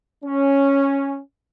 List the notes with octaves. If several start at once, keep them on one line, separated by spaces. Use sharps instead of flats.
C#4